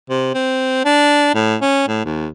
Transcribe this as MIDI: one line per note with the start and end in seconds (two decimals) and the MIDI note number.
0.10 0.30 48
0.34 0.85 60
0.85 1.30 62
1.34 1.56 45
1.61 1.84 61
1.88 2.04 45
2.05 2.28 39